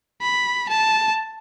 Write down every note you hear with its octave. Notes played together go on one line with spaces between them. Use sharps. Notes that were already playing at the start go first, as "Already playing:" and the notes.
B5
A5